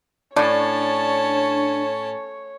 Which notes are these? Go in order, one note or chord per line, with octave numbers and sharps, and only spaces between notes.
A2 C#4 D4 C#5 A5